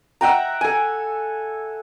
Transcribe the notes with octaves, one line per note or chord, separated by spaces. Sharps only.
E5 F#5 G5 A#5
A4 G#5